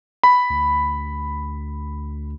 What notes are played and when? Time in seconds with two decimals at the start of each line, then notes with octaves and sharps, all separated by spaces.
0.24 B5
0.50 D2